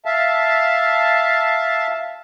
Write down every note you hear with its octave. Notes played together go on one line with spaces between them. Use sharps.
E5 F5 A5